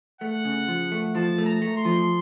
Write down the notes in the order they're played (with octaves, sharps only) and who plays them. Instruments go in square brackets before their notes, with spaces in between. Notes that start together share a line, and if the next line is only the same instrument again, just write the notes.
[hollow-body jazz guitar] A3 [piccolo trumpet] F#5
[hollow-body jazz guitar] C#3
F3
A3
[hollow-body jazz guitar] F3 [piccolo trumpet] A5
[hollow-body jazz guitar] A3
[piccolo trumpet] A#5
[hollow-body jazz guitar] A3
[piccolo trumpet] C6
[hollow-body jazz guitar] F3